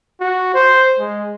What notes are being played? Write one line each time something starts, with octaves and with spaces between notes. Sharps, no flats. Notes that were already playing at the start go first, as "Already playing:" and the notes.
F#4
C5
G#3